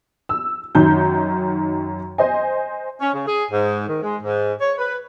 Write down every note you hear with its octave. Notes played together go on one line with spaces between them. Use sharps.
E6
F#2 D#3 G6
C5 D#5 G#5
C#4
C#3
G#4
G#2
D#3
G#3
G#2
C#5
B4